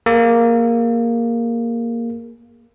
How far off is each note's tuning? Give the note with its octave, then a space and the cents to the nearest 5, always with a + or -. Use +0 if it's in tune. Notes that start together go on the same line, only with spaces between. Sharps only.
A#3 +0 G#4 +5